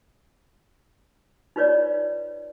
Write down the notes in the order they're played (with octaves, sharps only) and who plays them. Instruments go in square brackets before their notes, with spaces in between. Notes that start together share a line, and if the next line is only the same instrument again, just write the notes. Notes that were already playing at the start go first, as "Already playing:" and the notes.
[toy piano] D#4 F4 B4 C#5 D5